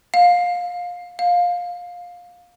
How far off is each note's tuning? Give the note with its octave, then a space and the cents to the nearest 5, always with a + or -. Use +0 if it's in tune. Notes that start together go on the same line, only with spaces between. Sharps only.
F5 +25
F5 +20